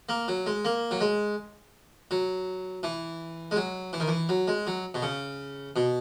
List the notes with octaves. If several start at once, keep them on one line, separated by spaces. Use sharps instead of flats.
A#3
F#3
G#3
A#3
F#3
G#3
F#3
E3
G#3
F#3
E3
D#3
E3
F#3
G#3
F#3
B2
C#3
B2